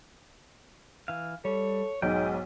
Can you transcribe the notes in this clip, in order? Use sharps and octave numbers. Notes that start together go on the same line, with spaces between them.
E3 F5
G3 A4 C#5
B1 G#2 G#3 D#5 G5